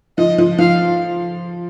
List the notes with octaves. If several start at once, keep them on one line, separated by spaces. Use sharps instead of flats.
F3 D#5
F3
F3 F5